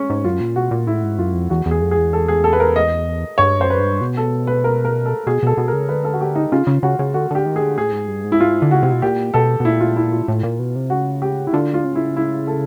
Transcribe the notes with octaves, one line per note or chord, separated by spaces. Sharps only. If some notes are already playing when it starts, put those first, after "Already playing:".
Already playing: C#4
G#2
F#2 F4
A#2
B2 F#4
A#2
A2 E4
G#2
F#2 F4
F2
E2 F#4
E2
G#4
F2
G#4
E2
A4
G#4
A4
B4
A#4
D#5
G2 C#5
F#2 C5
B4
G2
B2
A4
B4
A#4
A#4
A4
B2 G#4
B2 A4
B2
A#4
C#3
D3 B4
A4
F#4
G4
D#4
C#3 F4
C#3
C#3 F#4
C#3
D3 F#4
D3 G4
D#3
D3 G#4
A2 G#4
G#2
G2
G#2
E4
F4
D3
C#3 F#4
C3
B2
A#2 G4
B2 A4
B2
A#2 E4
F4
E4
F4
A2
A#2
B2
C3
C#3 F#4
G4
E4
D3 F4
F4
C#3
E4
E4
A4